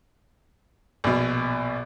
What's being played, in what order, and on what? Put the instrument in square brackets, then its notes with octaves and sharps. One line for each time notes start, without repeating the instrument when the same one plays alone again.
[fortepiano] A#1 B2